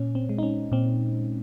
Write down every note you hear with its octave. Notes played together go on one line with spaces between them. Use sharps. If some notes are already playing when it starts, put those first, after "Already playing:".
Already playing: A#2 C#4
C4
G#3
D#4
C#4
A#2 C4